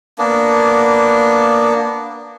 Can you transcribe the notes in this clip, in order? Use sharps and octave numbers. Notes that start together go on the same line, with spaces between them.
A#3 B3 D4